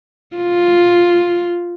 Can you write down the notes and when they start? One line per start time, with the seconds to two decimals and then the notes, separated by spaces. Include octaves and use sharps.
0.36 F4